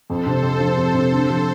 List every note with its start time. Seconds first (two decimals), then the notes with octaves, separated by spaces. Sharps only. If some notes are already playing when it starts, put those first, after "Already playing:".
0.09 F2 A4 C5
0.26 C3
0.43 F2
0.60 F3
0.77 F2
0.94 C3
1.12 D3
1.29 F3